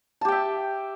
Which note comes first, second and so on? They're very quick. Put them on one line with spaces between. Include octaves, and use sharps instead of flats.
A5 G4 G5 E5